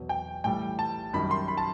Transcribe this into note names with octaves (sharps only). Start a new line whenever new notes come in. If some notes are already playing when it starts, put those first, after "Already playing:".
Already playing: E2 B2 F#3
G5
A2 E3 G3 G5
A5
F#2 D#3 G3 B5
C6
B5
A5